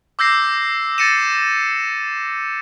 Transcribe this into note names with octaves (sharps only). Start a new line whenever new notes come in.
D6 E6 G6 A#6 C7
A6 A#6 C#7 D#7 E7